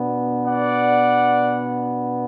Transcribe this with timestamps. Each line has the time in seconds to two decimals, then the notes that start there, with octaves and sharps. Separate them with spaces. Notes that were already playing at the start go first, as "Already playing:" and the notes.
Already playing: B2 B3 D4
0.45 D5 F#5